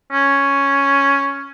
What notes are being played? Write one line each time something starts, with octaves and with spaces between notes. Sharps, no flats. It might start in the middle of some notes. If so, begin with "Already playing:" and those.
C#4